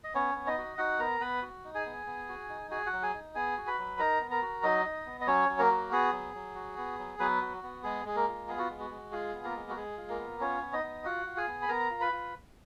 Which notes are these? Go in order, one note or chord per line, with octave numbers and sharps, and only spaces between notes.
D#5
B3 C#4 C#5
B3
D#4 D#5
F#4
D#4 F#4 F#5
B3 A#4 A#5
B3 B4 B5
F#4
D#4
G#4 G#5
B3
B3
F#4
D#4
F#4 G#4 G#5
F#4 F#5
F#3
G#4 G#5
D#4
B3 G#4 G#5
F#4
B4 B5
F#3
D#4 A#4 A#5
B3
A#4 A#5
F#4
F#3 D#4 D#5
D#4
B3
D#5
F#3 C#4 C#5
F#3
A#3 A#4
F#4
B3 G#4
F#3
F#3
F#4
B3
F#3
F#3 B3 B4
F#4
B3
G#3 G#4
G#3 G#4
A#3 A#4
F4
B3 G#4
F#4
G#3
F#4
G#3
F4 G#4
B3
A#3 A#4
G#3
F#4
G#3 G#4
F4
A#3 A#4
B3
C#4 F4 C#5
B3
D#4 D#5
B3
F4 F#4 F#5
F4
G#4 G#5
B3
B5
B3 A#4 A#5
F4
B4 B5
F4